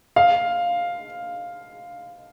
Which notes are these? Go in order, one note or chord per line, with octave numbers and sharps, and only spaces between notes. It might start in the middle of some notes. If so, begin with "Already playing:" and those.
F5